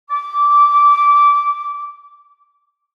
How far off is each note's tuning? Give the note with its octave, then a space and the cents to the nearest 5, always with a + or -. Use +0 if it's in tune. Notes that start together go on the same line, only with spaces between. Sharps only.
D6 -15